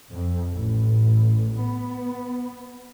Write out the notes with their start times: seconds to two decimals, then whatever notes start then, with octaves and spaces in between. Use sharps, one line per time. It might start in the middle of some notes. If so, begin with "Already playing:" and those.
0.11 F2
0.54 A1
1.60 B3